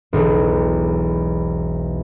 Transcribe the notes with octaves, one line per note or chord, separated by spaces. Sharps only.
E1 B1 B2 E3